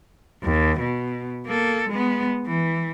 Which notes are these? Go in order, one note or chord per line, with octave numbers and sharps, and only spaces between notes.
D#2
B2
A#3 A4
G#3 B3
E3